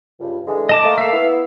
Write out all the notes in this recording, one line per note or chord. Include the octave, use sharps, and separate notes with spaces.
C#2 G2
D3 E3 G#3
D#5 A5 D6
A3 A#3
E5 F5
B3 E4